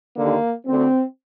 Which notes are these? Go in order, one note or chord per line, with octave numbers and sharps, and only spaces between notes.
D#2 D3 A#3
D2 D3 C4